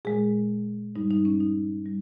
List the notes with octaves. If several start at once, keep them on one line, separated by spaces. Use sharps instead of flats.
A#2 G#3 G#4
G2 G3 D#4
D#4
C#4
D#4
G3